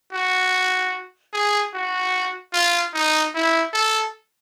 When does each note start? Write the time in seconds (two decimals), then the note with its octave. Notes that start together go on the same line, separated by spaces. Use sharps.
0.13 F#4
1.33 G#4
1.74 F#4
2.53 F4
2.94 D#4
3.34 E4
3.74 A4